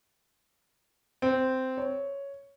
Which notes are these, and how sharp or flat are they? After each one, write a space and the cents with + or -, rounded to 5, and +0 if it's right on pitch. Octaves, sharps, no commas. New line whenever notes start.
C4 -10
C#5 +5